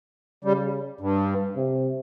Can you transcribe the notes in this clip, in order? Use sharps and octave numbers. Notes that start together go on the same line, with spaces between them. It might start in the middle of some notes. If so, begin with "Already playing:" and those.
C#3 G3
G2
C3